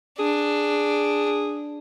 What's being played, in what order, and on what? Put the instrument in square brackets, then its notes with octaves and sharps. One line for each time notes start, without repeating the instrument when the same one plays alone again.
[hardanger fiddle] D4 [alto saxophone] G#4